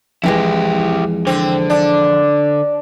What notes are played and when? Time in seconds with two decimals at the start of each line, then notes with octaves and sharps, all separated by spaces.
0.24 F2 E3 G#3 E4 G4
1.27 D3 C4
1.70 D4